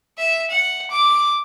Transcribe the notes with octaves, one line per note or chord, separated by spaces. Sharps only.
E5
F#5
D6